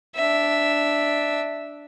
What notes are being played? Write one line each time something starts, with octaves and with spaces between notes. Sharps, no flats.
D4 E5